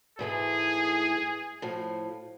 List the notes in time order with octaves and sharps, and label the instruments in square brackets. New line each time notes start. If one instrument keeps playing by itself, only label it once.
[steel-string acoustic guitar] G#2 E3 A3 [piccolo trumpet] G#4
[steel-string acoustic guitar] A2 F3